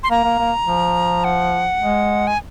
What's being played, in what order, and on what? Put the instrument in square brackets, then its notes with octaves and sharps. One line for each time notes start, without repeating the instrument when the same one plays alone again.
[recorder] C6
[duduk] A#3 [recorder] A#5
[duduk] A#3
A#3
F3
[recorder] F#5
[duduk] G#3
[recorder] G#5